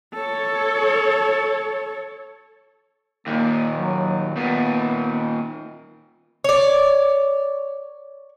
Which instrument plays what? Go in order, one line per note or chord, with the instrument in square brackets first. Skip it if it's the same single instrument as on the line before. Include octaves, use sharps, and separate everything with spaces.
[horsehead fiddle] A4 C#5
[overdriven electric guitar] D#2 A#2 [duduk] A#3
[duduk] F#3
[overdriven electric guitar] D#2 A#2 [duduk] B3
[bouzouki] C#5 D5